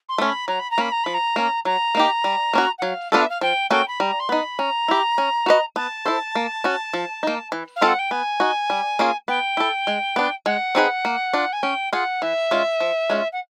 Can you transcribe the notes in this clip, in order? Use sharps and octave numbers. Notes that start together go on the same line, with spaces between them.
C6
A3 C#4
B5
F#3 A#5
B5
A#5
A#3 C#4 B5
A#5
F3 B5
A#5
A#3 C#4
F#3 A#5
A#3 D#4 G4
G3
A#3 C#4 F#4
F#5
F#3 F5
B3 D4 F4 A4 F5
E5
F5
F3 G5
A#3 C#4 F#4 A4 G5
B5
G3 A#5
C6
B3 D#4 B5
C#4 A#5
E4 G4
C#4
F#4 B4 D#5
B3 A5
E4 A4 C5
A#3
C#4 F#4
F3
A#3 D#4
E3
F5
G#3 C4 F4 A4
F#5
G5
B3 G#5
D#4 F#4
G3
A#3 C#4 F4 G#4
B3 G5
E4 A4
G#3
B3 D4
G#3 F#5
C4 D#4 G#4 B4
A#3
D4 F4
G#5
C#4 G5
F4 G#4 F#5
E3 E5
G#3 C#4 F4
F3
G#3 C#4 F4
F#5